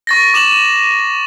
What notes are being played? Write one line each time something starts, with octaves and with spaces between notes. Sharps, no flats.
C#6 A6 A#6
D6 E7 F#7